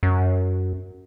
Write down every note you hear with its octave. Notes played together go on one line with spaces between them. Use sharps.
F#2